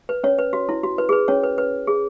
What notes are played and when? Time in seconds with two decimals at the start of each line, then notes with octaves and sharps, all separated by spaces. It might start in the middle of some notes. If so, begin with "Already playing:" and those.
0.09 B4
0.24 C#4 C#5
0.39 B4
0.53 F#4
0.69 E4
0.83 F#4
0.98 B4
1.09 G#4
1.13 B4
1.28 C#4 C#5
1.44 B4
1.58 B4
1.87 G#4